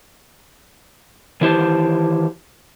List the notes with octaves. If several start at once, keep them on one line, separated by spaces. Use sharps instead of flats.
D#3 E3 E4 G4 C5 A5